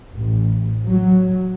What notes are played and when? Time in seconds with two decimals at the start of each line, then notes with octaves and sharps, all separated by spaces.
0.17 A1
0.86 F#3